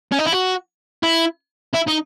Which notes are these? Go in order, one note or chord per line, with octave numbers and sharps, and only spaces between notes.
C#4
D#4
E4
F#4
E4
E4
D#4